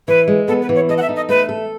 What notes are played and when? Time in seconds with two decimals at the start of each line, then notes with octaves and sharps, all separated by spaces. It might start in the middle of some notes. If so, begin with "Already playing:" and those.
0.08 E3 B4
0.28 G#3
0.48 B3 A4
0.62 B4
0.69 E3
0.75 C#5
0.89 A4 D#5
0.97 F#5
1.02 E5
1.09 D#4
1.16 D#5
1.29 A3 B4
1.49 A4